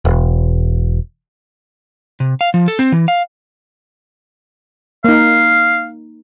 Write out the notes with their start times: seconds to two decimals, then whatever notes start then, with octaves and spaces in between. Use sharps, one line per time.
0.05 E1
2.20 C3
2.41 F5
2.54 F3
2.68 A4
2.79 C4
2.92 E3
3.08 F5
5.04 A#3 D#4 F5